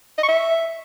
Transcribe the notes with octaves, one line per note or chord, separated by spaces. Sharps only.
D#5
C#6
E5